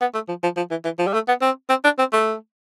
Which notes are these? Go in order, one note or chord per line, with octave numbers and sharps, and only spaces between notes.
B3
A3
F3
F3
F3
E3
E3
F3
G3
A3
B3
C4
C4
D4
C4
A3